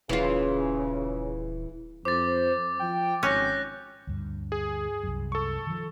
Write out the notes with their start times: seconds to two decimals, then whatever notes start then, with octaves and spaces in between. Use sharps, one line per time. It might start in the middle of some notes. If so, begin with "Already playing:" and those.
0.09 D#1 C#3 E3 F4
2.05 F2 C5 D6 A6
2.79 F3 G5
3.23 G#1 C#4 F#6 G6 A#6
4.07 D2 G2
4.52 G#4
5.03 C2 F#2
5.32 A4 C#6
5.67 D#3 F3